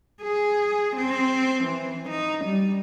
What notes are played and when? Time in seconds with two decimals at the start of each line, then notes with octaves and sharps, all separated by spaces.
0.22 G#4
0.97 C4
1.64 E3
2.09 D#4
2.45 G3